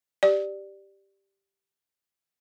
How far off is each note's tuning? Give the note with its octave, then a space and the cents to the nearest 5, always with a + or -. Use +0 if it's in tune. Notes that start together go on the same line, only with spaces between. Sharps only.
G4 +0 D5 +5